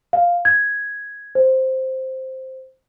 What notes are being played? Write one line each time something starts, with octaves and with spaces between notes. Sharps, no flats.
F5
G#6
C5